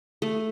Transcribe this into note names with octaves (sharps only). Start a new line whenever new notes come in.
A3